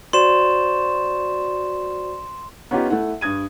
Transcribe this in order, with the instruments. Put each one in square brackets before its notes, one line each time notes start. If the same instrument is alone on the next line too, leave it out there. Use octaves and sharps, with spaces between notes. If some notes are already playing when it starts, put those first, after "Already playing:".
[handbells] F#4 C5 D5 [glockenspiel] C6 E7
[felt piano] B3 C#4 D#4 F4 G4
A3 E4 F#5
G2 D#6 G#6 D#7